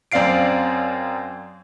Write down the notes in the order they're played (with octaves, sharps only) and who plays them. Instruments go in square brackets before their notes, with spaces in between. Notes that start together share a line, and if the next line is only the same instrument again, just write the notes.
[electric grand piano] F#2 C4 D5 F5 C7 D7